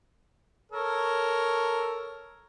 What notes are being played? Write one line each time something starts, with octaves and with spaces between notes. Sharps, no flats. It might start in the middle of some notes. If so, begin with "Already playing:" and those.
A4 A#4 C#5